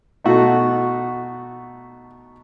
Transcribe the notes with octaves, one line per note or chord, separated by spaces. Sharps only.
B2 A3 D#4 F#4